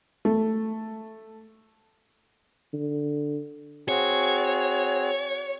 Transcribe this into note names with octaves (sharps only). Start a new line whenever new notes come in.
A3
D3
C4 F#4 G#4 C#5